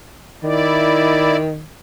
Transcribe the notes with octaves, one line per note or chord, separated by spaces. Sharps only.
D#3 E4 D5